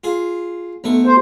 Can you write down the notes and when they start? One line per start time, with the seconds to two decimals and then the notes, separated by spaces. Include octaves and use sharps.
0.04 F4 G#4
0.84 B1 A3 C#6
1.06 C5